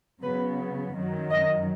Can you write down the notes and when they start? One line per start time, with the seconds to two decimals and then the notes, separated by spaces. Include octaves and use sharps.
0.21 C#3 F#3 B3 B4
0.94 F#2 D#3 F#3
1.30 D#5